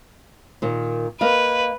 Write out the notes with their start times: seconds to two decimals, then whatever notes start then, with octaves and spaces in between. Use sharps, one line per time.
0.62 A#2 D#3
1.21 A#3 B4 D#5 F5